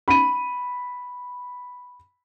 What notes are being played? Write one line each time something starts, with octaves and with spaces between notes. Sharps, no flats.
B5 D#7